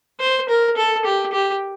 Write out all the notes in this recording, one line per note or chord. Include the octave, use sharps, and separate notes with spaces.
C5
A#4
A4
G4
G4